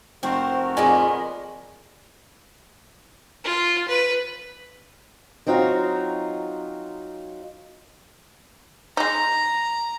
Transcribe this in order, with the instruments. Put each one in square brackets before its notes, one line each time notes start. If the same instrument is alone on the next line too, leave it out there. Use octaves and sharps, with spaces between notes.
[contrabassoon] F1 [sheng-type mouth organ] A3 F#4 A#4 [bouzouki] C4 C5
[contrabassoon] F2 [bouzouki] A#2 G#3 B3 [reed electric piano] G#5
[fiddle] F4
B4
[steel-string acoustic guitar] F#3 C4 D#4 F4 F#4
[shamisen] G#3 D#4 [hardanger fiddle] A#5